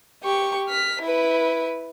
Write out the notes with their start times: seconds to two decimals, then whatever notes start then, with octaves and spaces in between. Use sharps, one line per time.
0.23 G4 C#6
0.68 F6 B6
1.01 E4 B4